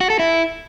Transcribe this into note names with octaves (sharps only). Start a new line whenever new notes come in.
F#4
A4
E4